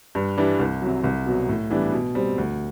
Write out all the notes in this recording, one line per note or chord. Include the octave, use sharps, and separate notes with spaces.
G2
E3 G3 D4
C2
C3 F#3
C2
B2 F#3
A2
E3 G3 B3 D4
B2
G3 C4
D2